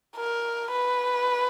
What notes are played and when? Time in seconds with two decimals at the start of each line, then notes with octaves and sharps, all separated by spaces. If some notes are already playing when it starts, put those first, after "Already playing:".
0.17 A#4
0.71 B4